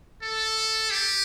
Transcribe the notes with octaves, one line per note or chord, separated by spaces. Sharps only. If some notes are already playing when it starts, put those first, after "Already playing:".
A4
G4